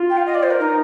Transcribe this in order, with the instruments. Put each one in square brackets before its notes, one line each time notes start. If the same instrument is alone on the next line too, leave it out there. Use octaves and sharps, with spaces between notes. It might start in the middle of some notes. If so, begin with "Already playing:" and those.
Already playing: [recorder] F4
[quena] G5
F5
D#5
D5
C5
A#4
[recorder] D#4